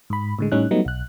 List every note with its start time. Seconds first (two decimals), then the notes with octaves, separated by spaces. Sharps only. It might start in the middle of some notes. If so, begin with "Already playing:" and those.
0.10 G#2 B5
0.39 A2 D3 G#3
0.52 A2 G3 C#4 D#4 F#6
0.71 F#3 G3 A3 B3 D#4
0.85 B1 F#6